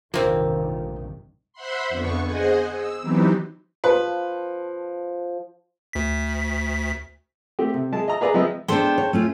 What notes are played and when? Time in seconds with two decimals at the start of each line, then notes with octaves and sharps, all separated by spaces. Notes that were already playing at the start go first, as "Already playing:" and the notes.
0.14 F1 A#1 G2 D3 D#3 F3 A#3 C4
1.53 C5 E5 F#5 B5 C6
1.89 F2 D3 B3 C#6
2.25 G#4 C5 D#5 F#5 G#5
2.73 E6
3.02 E3 F#3 B3 C4 D#4 G4
3.84 F3 B4
5.93 D2 B6
7.59 A3 C4 G4
7.74 C3
7.92 G#3 A5
8.08 D#5 A#5
8.21 G#4 B4 D5 A#5
8.34 F3 G#3 C4 B4 D#5 E5
8.68 G#3 B3 D4 A4 C5 G5
8.98 C#5
9.13 A3 C#4 F4